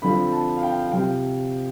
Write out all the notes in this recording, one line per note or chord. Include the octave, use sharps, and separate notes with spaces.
D3 F3 C4 B5
A5
F5
G5
F5
C3 F3 C4 G5